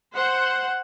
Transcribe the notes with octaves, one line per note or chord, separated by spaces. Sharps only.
C5 F#5